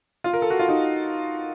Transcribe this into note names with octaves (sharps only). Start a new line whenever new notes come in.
F4
A#4
A4
F#4
F4
D#4